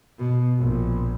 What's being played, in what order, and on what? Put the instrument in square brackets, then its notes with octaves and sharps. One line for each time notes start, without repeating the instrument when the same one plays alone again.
[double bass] B2
A#1